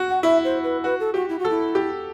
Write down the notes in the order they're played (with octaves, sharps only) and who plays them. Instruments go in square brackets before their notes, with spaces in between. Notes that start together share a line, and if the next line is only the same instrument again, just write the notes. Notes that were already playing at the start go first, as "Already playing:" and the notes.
Already playing: [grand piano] F#4
[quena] F#5
[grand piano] E4 [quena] E5
[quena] C5
B4
[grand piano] F#4 [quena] B4
[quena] A4
[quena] F#4 [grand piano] G4
[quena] E4
F#4
[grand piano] A4
[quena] E4
[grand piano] G4